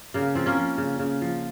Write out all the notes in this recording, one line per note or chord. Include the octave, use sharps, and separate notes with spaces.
C#3 A#3
F3 C4
A#3 C#4
F3
C#3
C#3
F3